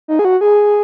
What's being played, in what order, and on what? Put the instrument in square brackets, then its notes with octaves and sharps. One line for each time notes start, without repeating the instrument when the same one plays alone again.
[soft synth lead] D#4
G#4
F#4
G#4